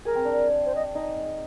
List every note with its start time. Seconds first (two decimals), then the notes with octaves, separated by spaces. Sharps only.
0.05 G#4 A#4
0.15 C4
0.25 D4
0.65 C5
0.75 D#5
0.95 D#4